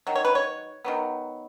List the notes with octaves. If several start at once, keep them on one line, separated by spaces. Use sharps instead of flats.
D#3 F#3
C#5
B4
C#5
D#3 F#3 B3